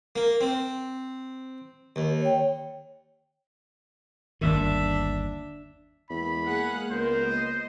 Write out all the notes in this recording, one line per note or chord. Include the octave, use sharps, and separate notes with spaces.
A#3
C4
D#2
C#5 G5
G1 D#2 D#3 D4 E5
E2 G#3 A#3 B5
G#4 F5 F#5
C#2 B3 A#4 C5
D#5